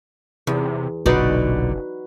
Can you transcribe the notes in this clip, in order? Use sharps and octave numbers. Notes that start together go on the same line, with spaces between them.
E2 C3
F#1 B1 A#2 D3 D#4 F#4 B4 D5